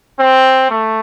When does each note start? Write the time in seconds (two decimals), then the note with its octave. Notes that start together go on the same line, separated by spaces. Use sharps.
0.19 C4
0.70 A3